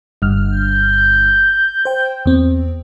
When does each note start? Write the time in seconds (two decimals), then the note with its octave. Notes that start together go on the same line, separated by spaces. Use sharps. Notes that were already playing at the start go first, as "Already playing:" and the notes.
0.22 G1 G2 F6
0.53 G6
1.85 C5 G5
2.26 E2 C4